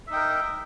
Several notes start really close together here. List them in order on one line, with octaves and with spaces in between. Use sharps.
E5 D#4 G5 A#4